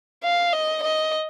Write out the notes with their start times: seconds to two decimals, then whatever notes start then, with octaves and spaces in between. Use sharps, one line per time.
0.23 F5
0.53 D#5
0.82 D#5